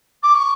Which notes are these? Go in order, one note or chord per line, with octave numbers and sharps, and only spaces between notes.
D6
C#6